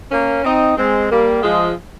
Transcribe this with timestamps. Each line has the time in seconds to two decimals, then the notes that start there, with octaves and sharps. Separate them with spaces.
0.11 A#3 C#4
0.44 C4 D#4
0.77 G#3 C4
1.10 G3 A#3
1.42 F3 G#3